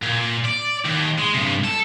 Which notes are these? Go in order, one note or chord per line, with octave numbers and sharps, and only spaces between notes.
A#2
D5
D#2
G#3
G2 C3
A4